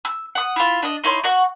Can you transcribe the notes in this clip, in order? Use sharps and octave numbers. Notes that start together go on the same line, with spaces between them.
E6
F#5 D#6
E4 F4
D4 D#5
D#4 E4 C#5 C6
F#4 F#5 C#6